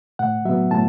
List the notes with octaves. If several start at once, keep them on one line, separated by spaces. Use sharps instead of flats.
A2 F#5
F#3 B3 E5
A2 A5